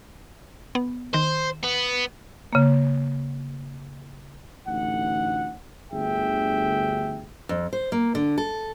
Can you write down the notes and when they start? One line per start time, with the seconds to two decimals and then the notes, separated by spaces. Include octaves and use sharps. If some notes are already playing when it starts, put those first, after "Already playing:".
0.75 B3
1.14 D#3 C5
1.64 B3
2.53 C#3 A#3
4.68 A1 D2 D#4 F#5
5.91 G1 D2 G#4 E5 G5
7.49 F2
7.73 C5
7.92 A#3
8.15 D3
8.38 A4